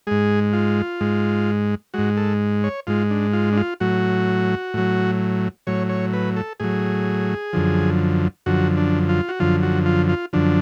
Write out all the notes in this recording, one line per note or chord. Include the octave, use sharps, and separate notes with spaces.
G#2 G#3 G#4
F4
G#2 G#3
G#2 G#3 F#4
A4
C#5
G#2 G#3 F4
D4
F4
D4
F4
A2 F#3 F#4
A2 F#3
A2 F#3 C#5
C#5
B4
A4
A2 F#3 G#4
F#2 D3 F3
F#2 D3 F3 F#4
D4
F4
F#4
F#2 D3 F3 F4
F#4
F4
F4
F#2 D3 F3 D4